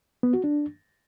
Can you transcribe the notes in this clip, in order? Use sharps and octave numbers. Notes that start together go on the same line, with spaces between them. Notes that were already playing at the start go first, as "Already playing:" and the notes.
B3
F#4
D4